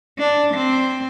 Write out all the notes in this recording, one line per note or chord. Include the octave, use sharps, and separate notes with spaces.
D4
C4